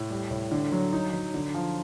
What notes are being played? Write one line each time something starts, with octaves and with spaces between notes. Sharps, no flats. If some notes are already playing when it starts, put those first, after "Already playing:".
Already playing: A2
G3
A2
D3
F#3
D#4
F#3
D3
F3